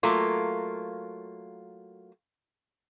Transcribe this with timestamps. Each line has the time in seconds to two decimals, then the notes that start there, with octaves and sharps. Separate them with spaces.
0.03 F#3 A3 A#3 F4